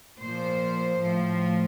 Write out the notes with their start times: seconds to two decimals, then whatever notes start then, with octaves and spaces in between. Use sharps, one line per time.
0.22 A#2 F3 C5
1.01 A2 F3